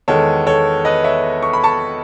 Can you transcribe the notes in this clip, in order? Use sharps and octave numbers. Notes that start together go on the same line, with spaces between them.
E2 D#3 G#3 B3 A4 C#5
A4 C#5
B4 D#5
C#5 E5
C#6
B5
A5 C#6